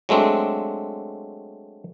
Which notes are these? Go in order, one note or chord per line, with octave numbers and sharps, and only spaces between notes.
F#3 G#3 A3 C4 D4